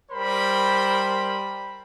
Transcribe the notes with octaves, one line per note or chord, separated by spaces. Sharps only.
G3 A#4 C5 B5